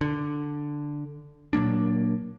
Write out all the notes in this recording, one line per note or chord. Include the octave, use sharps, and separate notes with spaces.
D3
A#2 F#3 A#3 D4